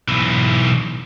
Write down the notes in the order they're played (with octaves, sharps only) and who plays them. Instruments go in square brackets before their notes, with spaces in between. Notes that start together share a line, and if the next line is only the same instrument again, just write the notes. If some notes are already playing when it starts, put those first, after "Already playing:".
[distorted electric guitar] B1 E3